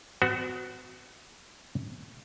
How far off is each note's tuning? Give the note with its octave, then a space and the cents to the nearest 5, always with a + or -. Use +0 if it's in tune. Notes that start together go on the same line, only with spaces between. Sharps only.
B3 +45 F#4 +0